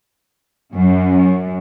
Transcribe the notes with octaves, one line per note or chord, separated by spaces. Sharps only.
F#2